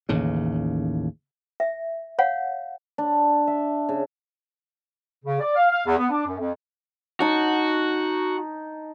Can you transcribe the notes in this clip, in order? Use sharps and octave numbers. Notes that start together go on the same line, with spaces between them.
A1 D#2 C#3
E5
C#5 F5 F#5
D4
E5
C#3
C#3
D5
F5
F5
E2
B3
D4
F#2
F2
D#4 F#4 A5